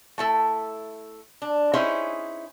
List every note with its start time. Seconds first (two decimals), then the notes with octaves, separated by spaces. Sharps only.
0.18 A3 E4 A4
1.42 D4
1.74 C#4 D#4 E4 G#4 C5 C#5